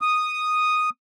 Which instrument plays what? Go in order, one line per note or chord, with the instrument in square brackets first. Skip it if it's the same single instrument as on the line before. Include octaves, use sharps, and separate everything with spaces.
[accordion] D#6